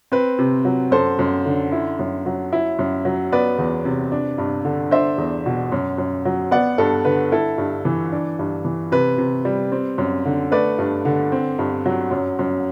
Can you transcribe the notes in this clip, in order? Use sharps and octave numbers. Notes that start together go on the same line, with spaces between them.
C4 B4
C3
F#3
F#2 A4 C5
F#2
D3
E4
F#2
F#3
E4
F#2
F#3
B3 B4 D5
E2
C3
D4
G2
D3
D4 C5 E5
E2
B2
F#2
F#2
F#3
B3 D5 F#5
G2 A4
D3 B4
E4 A4
G2
E3
D4
G2
E3
C3 B4
C3
G3
C4
F#2
D3
A3 B4 D5
G2
D3
C4
G2
F#3
F#2
F#2